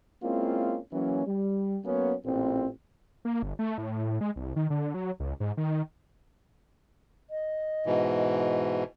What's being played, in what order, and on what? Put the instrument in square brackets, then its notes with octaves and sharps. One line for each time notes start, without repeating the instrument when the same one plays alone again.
[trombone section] G#3 A#3 C4 C#4 E4 F4
E3 F#3 A#3 C#4
G3
F#3 A#3 B3 C#4
A1 A#2 C4
[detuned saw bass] A#3
G1
A3
A2
G#3
C2
D#3
D3
F#3
C#2
G#2
D#3
[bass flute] D#5
[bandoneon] G#2 B2 E3